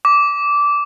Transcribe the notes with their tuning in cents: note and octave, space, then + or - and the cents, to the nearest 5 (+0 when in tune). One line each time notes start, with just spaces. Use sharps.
D6 -15